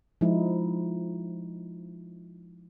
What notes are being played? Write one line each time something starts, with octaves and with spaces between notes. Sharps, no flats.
F3 G#3 D#4 E4